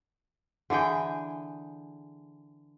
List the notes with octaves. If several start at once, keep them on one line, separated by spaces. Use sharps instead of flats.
D3 E3 G#4 G5